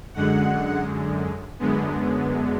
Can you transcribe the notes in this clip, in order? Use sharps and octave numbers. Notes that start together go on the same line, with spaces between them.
F#2 D3 G#3 F#5
F#2 D3 G#3 B3